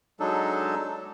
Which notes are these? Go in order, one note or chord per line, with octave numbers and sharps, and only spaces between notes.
F#3 G#3 D4 D#4 A4